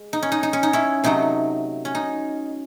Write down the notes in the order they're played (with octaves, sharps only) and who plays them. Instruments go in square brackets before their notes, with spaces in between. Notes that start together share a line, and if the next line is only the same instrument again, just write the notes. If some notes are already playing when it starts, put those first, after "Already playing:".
Already playing: [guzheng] G#3
D#4
C#4
D#4
D#4
C#4
D#4
C#4 E4
C3 F#3 A3 D#4
C#4
D#4